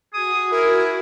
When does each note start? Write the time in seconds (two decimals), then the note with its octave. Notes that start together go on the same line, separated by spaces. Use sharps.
0.14 F#4 G#4 D#6
0.51 E4 A#4